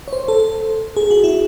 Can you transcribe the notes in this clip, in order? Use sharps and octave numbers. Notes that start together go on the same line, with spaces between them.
C#5
C5
A4
G#4
F#4
E4